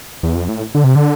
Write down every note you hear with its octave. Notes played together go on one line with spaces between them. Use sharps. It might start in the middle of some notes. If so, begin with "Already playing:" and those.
E2
F2
A2
D3
C3
D3